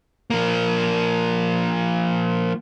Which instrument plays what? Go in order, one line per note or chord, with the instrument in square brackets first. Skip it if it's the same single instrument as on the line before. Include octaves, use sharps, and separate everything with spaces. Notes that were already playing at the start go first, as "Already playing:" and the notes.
[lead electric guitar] F3 A#3